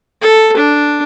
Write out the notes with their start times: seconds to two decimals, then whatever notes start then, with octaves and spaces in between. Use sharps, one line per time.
0.22 A4
0.57 D4